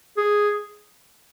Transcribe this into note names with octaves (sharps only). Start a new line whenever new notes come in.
G#4